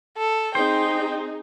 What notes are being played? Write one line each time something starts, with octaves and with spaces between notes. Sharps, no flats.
A4
C4 D#4 G#4 C5 G5